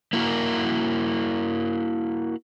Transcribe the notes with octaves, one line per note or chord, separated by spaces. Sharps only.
A#3 E4 F#4 A#4